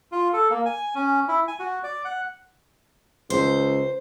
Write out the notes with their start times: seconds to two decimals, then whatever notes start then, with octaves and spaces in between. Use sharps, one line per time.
0.12 F4
0.33 A4
0.50 A#3
0.66 G#5
0.95 C#4
1.28 E4
1.48 G#5
1.59 F#4
1.83 D5
2.05 F#5
3.30 C#2 C5